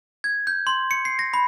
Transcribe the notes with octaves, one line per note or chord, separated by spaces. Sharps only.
G#6
G6
C6
C#7
C7
A#6
B5